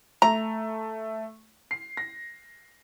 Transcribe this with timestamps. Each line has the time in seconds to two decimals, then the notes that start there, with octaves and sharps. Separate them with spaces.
0.22 A3 A#5
1.71 C7
1.97 A#6